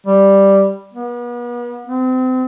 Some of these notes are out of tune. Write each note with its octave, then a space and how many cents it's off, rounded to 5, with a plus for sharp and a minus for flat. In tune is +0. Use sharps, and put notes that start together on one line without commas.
G3 +0
B3 -40
C4 -35